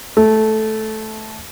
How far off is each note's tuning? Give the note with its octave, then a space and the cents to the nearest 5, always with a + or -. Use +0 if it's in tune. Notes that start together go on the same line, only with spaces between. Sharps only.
A3 -10